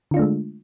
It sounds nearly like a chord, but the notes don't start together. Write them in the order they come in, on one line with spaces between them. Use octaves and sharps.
D3 F4 D4 A3 G#3